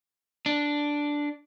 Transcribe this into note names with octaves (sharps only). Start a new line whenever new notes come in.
D4